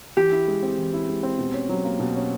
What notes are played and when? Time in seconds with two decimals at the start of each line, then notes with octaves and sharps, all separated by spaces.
0.17 E3 G4
0.32 E4
0.48 G#3
0.62 C4
0.78 E3
0.94 E4
1.08 G#3
1.23 C4
1.38 B2
1.53 C#4
1.69 F#3
1.84 A#3
1.99 B2
2.15 C#4